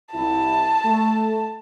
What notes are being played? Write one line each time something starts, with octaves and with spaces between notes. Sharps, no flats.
C2 E4 A5
A3